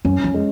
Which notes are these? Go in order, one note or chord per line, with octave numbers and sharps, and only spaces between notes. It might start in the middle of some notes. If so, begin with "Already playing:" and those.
F#2 C#4
F2
G#3